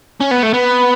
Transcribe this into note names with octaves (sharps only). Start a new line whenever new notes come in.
C#4
B3
A3
B3